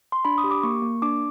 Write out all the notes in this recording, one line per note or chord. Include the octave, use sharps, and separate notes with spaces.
C6
D4 B5
D#6
G4
D6
A#3 C#6
A#3
D4 D6